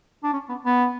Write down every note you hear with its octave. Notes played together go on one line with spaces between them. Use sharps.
D4
C#4
B3
B3